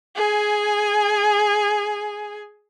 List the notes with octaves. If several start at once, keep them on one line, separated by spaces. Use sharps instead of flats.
G#4 G#5